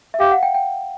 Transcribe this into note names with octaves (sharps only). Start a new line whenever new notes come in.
E5
G4 F5
F#5
G5
G5